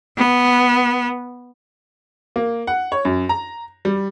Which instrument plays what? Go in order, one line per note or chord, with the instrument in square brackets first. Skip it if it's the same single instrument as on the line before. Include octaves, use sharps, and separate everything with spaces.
[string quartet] B3
[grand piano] A#3
F#5
C#5
F#2
A#5
G3